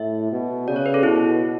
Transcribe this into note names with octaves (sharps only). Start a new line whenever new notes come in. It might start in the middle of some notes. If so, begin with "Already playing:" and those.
Already playing: A2 E5
B2
C#3 D5
C#5
B4
A4
B2 E4